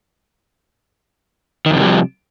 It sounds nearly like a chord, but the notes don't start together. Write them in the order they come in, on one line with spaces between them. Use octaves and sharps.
D#3 F2 C3 G3 F3